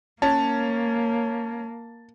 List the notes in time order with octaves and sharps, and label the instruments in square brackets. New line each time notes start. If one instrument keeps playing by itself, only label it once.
[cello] A#3 [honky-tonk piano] C#4 [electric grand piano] A5